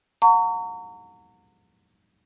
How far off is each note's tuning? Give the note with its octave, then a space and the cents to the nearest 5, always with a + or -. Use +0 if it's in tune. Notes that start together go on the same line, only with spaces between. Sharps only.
F#5 -40 A#5 -30 C#6 +25